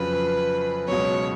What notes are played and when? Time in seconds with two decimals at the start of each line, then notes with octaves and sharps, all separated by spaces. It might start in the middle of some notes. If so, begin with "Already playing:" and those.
Already playing: F2 C#3 F#3 C#4 F4 B4
0.88 C#2 B2 F#3 C#5